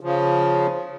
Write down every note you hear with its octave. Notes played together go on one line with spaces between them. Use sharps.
C#3 F3